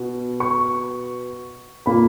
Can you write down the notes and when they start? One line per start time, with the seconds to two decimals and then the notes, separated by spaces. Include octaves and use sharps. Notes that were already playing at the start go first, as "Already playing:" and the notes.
Already playing: B2
0.40 C#6
1.86 A#2 A#3 B5